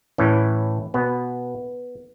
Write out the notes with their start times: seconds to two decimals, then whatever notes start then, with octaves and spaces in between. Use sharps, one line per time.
0.18 A2 E3 C#4
0.94 B2 B3